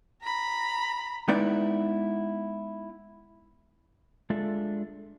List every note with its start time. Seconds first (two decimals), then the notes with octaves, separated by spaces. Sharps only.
0.23 A#5 B5
1.28 G#3 B3 D#4 E4 B4 D5
4.30 G#3 D4 F4 A4 E5